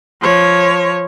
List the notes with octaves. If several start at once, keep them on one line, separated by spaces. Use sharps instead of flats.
F3 C#5